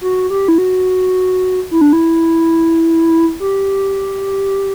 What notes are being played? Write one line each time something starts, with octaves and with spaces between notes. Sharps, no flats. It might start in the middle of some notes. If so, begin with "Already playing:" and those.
F#4
G4
E4
F#4
E4
D4
E4
G4